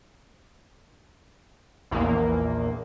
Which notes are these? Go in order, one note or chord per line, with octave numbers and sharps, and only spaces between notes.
A#1 E2 A#3